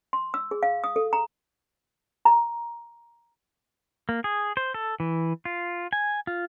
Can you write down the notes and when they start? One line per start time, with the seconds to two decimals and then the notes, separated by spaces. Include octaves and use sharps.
0.13 C6
0.34 E6
0.51 G#4
0.63 F5
0.84 D#6
0.96 A4
1.13 A#5
2.25 A#5
4.09 A#3
4.24 G#4
4.57 C5
4.74 A4
5.00 E3
5.45 F4
5.93 G#5
6.27 F4